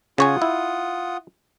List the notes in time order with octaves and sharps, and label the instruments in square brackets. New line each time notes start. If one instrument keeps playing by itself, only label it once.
[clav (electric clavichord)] C#3 C#5 G#5 [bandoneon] F4 F#5 D#6
[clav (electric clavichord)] E4